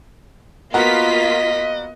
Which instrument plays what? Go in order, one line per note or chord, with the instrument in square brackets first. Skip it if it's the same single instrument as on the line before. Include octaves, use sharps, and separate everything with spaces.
[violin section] A#3 F4 B6 [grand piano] B3 F#4 A#4 [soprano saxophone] D#5